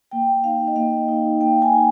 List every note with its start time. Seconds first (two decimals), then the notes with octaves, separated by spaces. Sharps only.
0.11 A#3 G5
0.44 D#4 F5
0.68 D#5
0.76 A#3 F5
1.08 D#4
1.41 A#3 G5
1.62 G#5
1.73 D#4